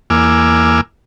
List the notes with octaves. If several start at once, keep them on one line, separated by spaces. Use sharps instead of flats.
E2 A#3 G#5 D6 E6 F6